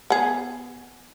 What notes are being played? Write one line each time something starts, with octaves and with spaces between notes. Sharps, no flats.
B3 G#4